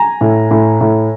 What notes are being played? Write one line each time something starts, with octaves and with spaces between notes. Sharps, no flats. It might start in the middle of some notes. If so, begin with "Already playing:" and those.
Already playing: G#5 A#5
A2
A2
A2